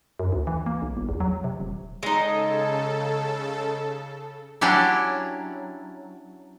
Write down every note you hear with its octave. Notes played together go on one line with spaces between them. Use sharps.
F#2
D2
E3
A#3
B1
G1
E2
F#3
C3
D#1
C#3 G#3 D#4 A4
F#3 C#4 D4 E4 G4